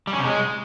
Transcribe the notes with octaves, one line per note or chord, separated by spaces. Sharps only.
G3
C#4
C3
G#3